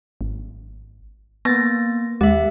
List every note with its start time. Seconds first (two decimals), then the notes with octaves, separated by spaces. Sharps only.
0.21 G#1
1.45 A#3 B3 A6 A#6
2.21 D#2 G#3 G4 E5